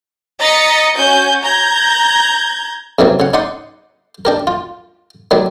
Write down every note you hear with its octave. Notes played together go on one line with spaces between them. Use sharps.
D#5 A#5 A6 B6 C#7
C#4 F#4 G#5 G6
A#5 G6 G#6
E2 C3 D#3 E3 F#3
C#3 F#5
D#4 D5 F#5 C6 D#6
D4 G4 A#4
F4
D#3 F#3 G3